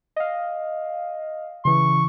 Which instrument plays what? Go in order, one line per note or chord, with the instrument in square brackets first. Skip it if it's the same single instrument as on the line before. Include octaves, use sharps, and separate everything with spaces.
[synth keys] D#5 F5
[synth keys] C#3 E3 [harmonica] C#6